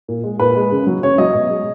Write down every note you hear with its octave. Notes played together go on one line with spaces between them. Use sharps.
A#2
G#3
A#2 B4
G#3
C#3
F#3
C#3 C#5
F#3 D#5
B2
G#3